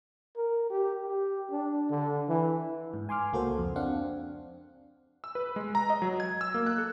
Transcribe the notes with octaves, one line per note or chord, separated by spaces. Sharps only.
A#4
G4
G4
D4
D3
E3
G#2
G#5 C6 D6 F6
C#2 A#3 F#4 A4 C5
F2
C4 D4 F5 F#5
E6
B4
G#3
A#5
D#5
F#3
G#6
E6
A#3
F#6
A4